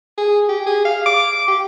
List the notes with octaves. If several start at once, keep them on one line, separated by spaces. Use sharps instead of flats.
G#4
G4
G#4
F5
D6
G4